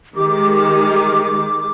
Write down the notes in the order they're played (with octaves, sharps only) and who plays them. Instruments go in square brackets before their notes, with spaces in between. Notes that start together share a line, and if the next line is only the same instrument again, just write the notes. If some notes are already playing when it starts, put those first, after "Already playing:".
[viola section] D#3 G#3 [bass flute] G4 [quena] D6